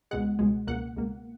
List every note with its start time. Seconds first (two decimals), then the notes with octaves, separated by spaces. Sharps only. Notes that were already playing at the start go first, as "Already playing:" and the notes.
0.11 C#2 B2 G#3 F#5
0.39 C#2 B2 G#3
0.67 C#2 B2 A#3 F#5
0.96 C#2 B2 A#3